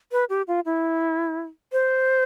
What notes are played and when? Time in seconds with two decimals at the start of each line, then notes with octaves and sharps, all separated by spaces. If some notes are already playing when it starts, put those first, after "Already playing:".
0.12 B4
0.29 G4
0.48 F4
0.65 E4
1.72 C5